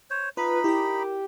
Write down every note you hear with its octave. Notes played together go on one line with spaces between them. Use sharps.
C5 C#5
D#4 F4 B4 B5
E4 G4 A#4